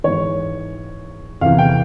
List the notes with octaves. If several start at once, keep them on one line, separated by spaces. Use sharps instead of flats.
G#2 E3 C#5
E2 C3 E3 F5
G5